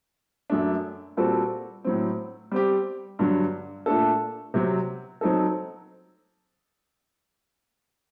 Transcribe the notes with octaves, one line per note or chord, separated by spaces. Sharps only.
F#2 F#3 A3 D4
A#2 G3 C4 F#4 A4
A2 F#3 C4
G3 C4 G4
G2 D3 F#3
A#2 A3 D4 A4
C3 F#3 C4
F#3 C4 D#4 A4